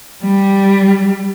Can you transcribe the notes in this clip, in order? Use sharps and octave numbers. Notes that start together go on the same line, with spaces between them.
G3